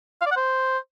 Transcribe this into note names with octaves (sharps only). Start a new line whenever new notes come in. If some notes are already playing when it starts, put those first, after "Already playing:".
F5
D5
F#5
C5